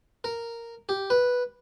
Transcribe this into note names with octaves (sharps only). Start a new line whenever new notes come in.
A#4
G4
B4